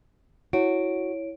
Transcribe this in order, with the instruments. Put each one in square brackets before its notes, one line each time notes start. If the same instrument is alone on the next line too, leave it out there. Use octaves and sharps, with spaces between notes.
[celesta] E4 C#5 D7 [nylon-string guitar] F#4